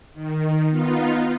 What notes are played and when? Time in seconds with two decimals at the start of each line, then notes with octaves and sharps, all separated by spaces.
0.14 D#3
0.70 B3 D#4 F4